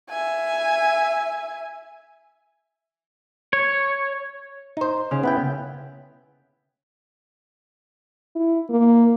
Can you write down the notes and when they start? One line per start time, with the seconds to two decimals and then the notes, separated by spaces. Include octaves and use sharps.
0.10 E5 G#5
3.53 C#5
4.77 D#4 C5
5.11 C#3
5.23 B3 E4 B4 G5
8.35 E4
8.70 A#3